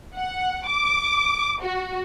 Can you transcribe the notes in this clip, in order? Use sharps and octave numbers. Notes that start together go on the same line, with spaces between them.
F#5
D6
F#4